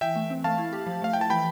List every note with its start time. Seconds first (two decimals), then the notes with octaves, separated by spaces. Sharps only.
0.01 E3 E5 G5
0.15 A3
0.30 C4
0.44 A3 F5 A5
0.58 E4
0.73 G4
0.86 F3
1.02 A3 F5
1.13 E4 G5
1.21 A5
1.30 E3 G5 B5